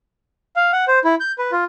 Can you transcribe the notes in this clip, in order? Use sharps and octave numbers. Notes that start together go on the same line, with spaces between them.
F5
F#5
C5
E4
G6
B4
F4